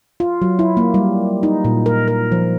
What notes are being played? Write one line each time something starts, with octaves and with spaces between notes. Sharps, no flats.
F4
F#3
E4
A#3
G3
D#4
A#2
A#4
A#4
F3